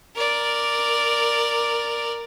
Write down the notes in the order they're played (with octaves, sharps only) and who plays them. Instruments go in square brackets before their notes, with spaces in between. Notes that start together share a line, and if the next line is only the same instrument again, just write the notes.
[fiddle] A#4 D5